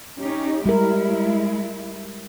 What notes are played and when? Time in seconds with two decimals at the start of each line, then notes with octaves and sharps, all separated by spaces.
0.20 C#4 D#4 G4
0.66 G3 G#3 E4 G4 A#4